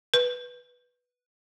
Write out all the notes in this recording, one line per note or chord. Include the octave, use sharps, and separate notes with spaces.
B4